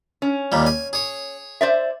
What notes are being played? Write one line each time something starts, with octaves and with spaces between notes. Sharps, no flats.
C#4
D#2 A#2 G3
G#5
G#4 C#5
C5 D5 E5